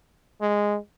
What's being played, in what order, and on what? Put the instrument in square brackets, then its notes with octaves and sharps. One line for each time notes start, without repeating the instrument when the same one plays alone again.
[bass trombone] G#3